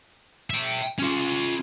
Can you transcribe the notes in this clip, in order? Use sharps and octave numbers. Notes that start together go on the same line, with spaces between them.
E5 G5
C#4 F4